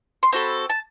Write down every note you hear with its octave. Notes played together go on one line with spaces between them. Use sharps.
C6
C4 F#4 A4 B5
A5